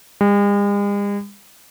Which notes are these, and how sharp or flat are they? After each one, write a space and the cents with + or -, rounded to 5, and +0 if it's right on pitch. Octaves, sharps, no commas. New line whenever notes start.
G#3 -45